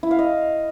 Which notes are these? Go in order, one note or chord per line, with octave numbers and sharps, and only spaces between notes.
E4
F5
D#5